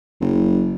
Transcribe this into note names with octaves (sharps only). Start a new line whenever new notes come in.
F#1